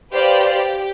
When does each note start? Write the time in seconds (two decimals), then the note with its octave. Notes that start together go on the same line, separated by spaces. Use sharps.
0.12 G4 B4 C5 D5 F5
0.52 G4